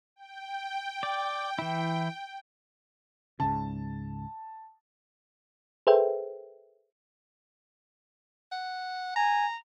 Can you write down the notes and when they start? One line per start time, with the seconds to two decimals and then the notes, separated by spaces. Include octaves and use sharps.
0.16 G5
1.03 D5
1.59 E3 E4
3.40 C#2 G#2 C#3 A5
5.87 G#4 A4 B4 C5 E5 G5
8.52 F#5
9.16 G#5 A#5